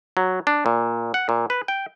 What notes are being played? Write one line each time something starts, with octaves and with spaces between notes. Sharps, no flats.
F#3
D4
A#2
F#5
A#2
B4
G5